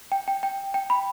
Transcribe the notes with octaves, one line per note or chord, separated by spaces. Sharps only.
G5
G5
G5
G5
B5